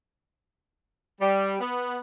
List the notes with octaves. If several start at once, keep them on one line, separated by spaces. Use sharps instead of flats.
G3
B3